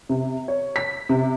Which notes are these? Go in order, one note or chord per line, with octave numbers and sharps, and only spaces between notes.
C3
C#5
B6
C3